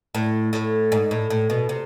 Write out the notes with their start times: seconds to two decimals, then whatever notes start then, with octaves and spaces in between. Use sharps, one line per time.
0.15 A2
0.53 A2
0.92 G#2
1.11 A2
1.30 A2
1.50 B2
1.69 C3